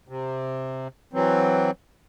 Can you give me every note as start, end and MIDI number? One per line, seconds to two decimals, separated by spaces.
0.08 0.88 48
1.13 1.71 52
1.13 1.71 54
1.13 1.71 60